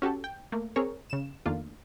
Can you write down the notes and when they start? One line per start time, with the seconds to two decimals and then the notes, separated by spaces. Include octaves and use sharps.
0.02 C#4 F#4 G4 A4
0.24 G5
0.52 A3 A#3
0.76 C4 G#4 A#4 C#5
1.10 C#3 E7
1.46 F2 D#3 A3 A#3 D4 F4